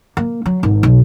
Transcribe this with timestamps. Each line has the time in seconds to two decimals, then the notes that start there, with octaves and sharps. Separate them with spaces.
0.17 A#3
0.46 F#3
0.63 G#1
0.83 B1